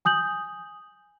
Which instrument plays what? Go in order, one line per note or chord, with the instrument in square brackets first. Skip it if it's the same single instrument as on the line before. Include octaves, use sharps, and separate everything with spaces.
[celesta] G#5 D#6 G6 F#7